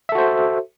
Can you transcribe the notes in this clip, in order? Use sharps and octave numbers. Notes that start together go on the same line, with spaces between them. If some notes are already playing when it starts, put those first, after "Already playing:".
F#4 A4 C5 E5